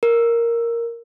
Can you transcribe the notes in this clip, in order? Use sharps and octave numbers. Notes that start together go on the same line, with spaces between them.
A#4